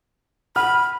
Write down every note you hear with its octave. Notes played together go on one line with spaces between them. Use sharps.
F#5 B5 F6